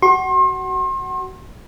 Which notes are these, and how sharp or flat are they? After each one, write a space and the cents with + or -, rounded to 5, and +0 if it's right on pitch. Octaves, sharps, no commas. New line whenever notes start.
F#4 +20 C6 +40